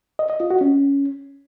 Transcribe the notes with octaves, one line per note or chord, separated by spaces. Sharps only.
D#5
D#5
F4
F#4
C#4